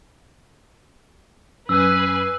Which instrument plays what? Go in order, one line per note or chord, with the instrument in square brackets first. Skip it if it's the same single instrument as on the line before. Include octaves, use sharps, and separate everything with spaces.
[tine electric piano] F#2 [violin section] B4 G#5 C7 [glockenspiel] E6 F#6